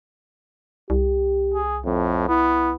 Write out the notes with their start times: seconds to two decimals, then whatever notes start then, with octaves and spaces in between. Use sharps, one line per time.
0.90 C2 G4
1.54 G#4
1.85 F2 A2
2.28 B3 E4